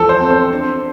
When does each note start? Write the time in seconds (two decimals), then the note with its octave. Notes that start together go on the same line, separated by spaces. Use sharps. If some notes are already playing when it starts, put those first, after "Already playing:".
Already playing: E2 F3 A4
0.09 C5
0.19 C4
0.30 C5
0.51 D4